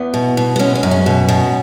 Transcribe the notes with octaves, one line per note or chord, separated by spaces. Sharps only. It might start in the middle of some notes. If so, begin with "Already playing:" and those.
Already playing: E2 B3
B2
B2
B3
G#3 C#4
C#4
F#2
C#4
B2
B2